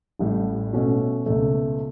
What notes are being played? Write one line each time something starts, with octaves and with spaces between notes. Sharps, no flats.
A1 A2 G3
B2 A3 C#4 F#4
C#2 B2 A3